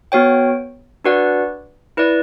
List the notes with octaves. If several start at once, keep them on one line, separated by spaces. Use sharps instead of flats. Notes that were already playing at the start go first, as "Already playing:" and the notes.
B3 F#4 C#5 G5
D4 F#4 B4 D5 F#5
E4 B4 D5